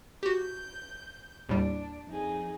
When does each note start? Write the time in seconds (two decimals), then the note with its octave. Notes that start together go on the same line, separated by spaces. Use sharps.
0.23 F#4 G4 G6
1.49 D#2 A2 G3 D4
2.07 F2 D#4 G#4